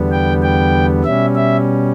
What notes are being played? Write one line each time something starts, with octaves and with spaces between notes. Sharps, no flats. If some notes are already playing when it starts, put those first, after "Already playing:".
Already playing: E2 D3 G3 B3
G5
G5
B2 G3 C#4 E5
E5